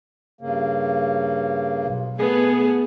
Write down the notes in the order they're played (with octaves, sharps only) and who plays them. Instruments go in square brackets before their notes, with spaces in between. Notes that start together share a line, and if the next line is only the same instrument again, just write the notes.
[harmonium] G2 C#3 A#3
[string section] B1
[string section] A3 B3 [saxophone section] G#4